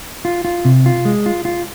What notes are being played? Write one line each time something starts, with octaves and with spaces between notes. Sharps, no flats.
F4
F4
C3
F4
G#3
F4
F4